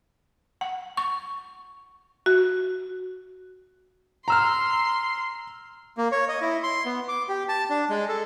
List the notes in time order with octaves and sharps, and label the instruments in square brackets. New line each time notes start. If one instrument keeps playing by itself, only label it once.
[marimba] F#5
C#6
F#4
[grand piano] A#5 E6 F6 [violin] C6
[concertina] A#3
C#5
D#5
E4
C6
B3
D6
G4
A5
D4
G#3
A4